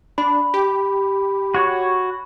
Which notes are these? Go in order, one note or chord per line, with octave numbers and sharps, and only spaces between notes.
D4 B5
G4
F#4 C#5